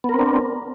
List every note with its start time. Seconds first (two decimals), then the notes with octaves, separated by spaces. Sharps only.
0.04 B3
0.09 A#4
0.14 C4
0.19 D4